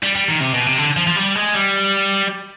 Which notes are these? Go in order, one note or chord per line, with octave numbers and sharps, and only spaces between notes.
G3
G3
D#3
C3
B2
C3
D3
F3
F3
G3
G#3
G3